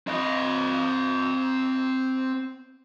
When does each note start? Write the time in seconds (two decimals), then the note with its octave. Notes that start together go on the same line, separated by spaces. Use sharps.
0.07 C4 D#5